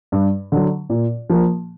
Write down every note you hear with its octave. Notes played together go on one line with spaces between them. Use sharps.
G2
D3 F#3
A#2
F3 A#3